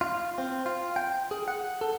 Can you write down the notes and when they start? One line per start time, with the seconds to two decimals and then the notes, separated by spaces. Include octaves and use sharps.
0.01 F4
0.38 C4
0.66 F4
0.96 G5
1.31 G#4
1.48 F#5
1.81 A4